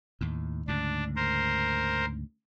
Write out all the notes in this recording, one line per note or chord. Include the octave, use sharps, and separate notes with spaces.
D#2 A2
D2 G#2 C#3 D4
A#4 C5